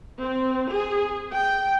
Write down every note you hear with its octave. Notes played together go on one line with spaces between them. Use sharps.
C4
G#4
G5